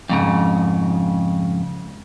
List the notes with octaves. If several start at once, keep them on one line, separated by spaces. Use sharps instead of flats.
F2 G#2 C#3